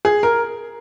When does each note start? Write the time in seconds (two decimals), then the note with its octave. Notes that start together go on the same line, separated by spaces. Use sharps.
0.05 G#4
0.23 A#4